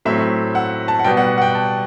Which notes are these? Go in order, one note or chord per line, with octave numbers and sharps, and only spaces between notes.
A2 F#3 A3 C4 E5
F#5
A5
F#5
B2 G3 B3 G5
F#5
F#5
G5
A5